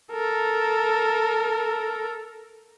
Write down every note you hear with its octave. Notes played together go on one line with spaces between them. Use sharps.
A4 A#4